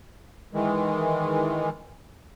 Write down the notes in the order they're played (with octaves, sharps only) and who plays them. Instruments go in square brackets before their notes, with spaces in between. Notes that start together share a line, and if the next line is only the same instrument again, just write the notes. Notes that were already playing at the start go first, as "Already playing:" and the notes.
[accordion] D#3 E3 G#3